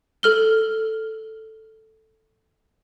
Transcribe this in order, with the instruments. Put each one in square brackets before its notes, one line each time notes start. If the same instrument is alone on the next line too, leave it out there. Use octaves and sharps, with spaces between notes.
[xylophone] A4 F6 G7